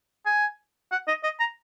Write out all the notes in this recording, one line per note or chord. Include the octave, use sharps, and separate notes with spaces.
G#5
F#5
D#5
D#5
A#5